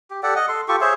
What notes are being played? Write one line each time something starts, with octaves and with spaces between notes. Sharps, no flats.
G4
G4 A4 D5 F#5
D#5 F#5
A4 C6
F4 G4 A4 C#6
G#4 C5 C#5 E5